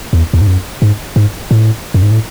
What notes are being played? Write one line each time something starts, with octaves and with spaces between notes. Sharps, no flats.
E2
E2
G#2
F#2
G#2
G#2
A2
F#2
G#2
A2